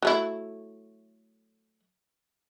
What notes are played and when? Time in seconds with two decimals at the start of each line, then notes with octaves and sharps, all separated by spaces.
0.03 F#3 A3 E4